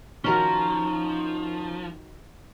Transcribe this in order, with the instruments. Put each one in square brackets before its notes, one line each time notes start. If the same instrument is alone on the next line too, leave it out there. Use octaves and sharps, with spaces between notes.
[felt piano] D#3 F#4 [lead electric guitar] F3 [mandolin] C#4 A#4 A#5